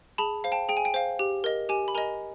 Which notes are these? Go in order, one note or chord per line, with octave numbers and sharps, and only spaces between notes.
G#4 A5 B5
C5 F5
G5 A5
G#4 G5
G#5
G5
C5 F5
G4
A#4 D#5
G4 G#5
B5
A#4 D#5 G#5 A#5